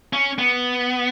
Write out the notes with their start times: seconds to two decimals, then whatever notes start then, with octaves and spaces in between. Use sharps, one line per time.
0.13 C#4
0.39 B3